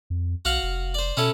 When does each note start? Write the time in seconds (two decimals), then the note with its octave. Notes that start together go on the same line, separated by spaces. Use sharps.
0.10 F2
0.45 B1 F#4 F5 F#5
0.63 F1
0.94 C5 D5
1.17 B2 C#4 E4 A4